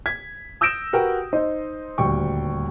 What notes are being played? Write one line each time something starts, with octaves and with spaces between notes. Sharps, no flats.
G#6 B6
D#6 E6 G6 A#6 D7 E7
F#4 G4 A#4 B4 F#5 G5
D#4 C5 D#5
D#1 D2 G3 G5 C#6